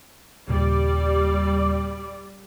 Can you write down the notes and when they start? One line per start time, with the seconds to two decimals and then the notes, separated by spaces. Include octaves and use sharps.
0.48 D#2 A#2 C#3 G3 D5